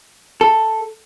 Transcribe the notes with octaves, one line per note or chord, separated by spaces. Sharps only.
A4